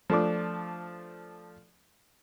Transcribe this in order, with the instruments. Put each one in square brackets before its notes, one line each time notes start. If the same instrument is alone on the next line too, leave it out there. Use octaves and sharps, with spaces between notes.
[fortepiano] F3 A3 D4 D6